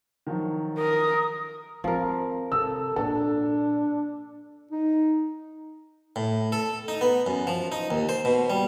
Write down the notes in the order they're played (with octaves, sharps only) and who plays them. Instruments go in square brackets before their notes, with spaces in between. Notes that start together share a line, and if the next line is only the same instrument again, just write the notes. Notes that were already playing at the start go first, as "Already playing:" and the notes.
[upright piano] D#3 F3 F#3
[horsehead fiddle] A#4 [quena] D#6
[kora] F3 A#4 [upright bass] C4
[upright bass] C3 [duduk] A4 [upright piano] E6
[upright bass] A#2 [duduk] D4 [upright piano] A4
[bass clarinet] D#4
[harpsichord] A2
A4
D#4
B3
F#2
F3
D#4
D#2
C5
B2
G3